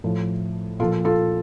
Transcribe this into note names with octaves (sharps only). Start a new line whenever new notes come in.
A2 F3
A#2 F3 F4 A4
F4 A4